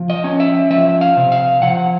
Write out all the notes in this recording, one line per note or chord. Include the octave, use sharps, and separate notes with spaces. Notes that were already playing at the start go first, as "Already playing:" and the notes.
Already playing: F3
D#5
C#4
E5
F3 E5
F5
C3
F5
F3 F#5